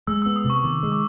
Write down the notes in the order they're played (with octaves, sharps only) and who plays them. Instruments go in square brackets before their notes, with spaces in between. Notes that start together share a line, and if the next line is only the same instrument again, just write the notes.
[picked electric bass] G#3 [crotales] E6
[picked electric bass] B3 [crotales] E6
[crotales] D#6
[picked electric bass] C3
[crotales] C#6
[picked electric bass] D#3 [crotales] D6
[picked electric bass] G#3
[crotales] D6